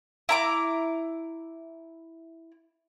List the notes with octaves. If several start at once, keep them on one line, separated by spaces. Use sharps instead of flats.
E4 A#5 D6